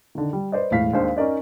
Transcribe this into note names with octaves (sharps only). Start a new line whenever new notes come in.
D3 D#3
G3
B4 C5 D5 D#5
E1 A2 F5 B6
D#2 G#3 D4 C5 F5
C#4 D#4 A#4 D5 D#5